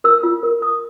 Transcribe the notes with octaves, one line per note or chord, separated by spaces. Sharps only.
A#4 E6
F4
A#4
A#4 D#6